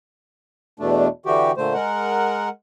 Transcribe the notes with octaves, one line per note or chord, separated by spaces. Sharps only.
E2 B2 A3 D4
D3 E3 F#4 G4
A#2 D3 A3 C5
G#3 A#4 F#5